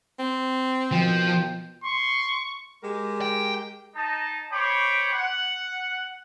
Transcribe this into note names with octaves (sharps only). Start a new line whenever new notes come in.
C4
B2 D#3 F3 G5
C6 C#6
G#3 G4 A#4
G5
D#4 A5
C5 C#5 G5 B5 C#6 D6
F#5